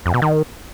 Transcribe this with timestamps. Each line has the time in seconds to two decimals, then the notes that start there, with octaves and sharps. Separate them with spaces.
0.06 F2
0.14 B2
0.22 D#3